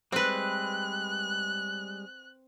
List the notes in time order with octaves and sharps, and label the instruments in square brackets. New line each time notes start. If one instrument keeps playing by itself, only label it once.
[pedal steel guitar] G3 G#3 [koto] C4 B4 [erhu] F#6